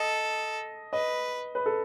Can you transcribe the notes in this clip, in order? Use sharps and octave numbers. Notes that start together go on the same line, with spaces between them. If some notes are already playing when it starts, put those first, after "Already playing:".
Already playing: A4 D#5
B4 D#5
B4
A4